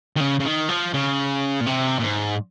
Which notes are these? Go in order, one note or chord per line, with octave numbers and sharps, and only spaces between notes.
D#3
C#3
C#3
D#3
F3
C#3
A#2
C3
A#2
G#2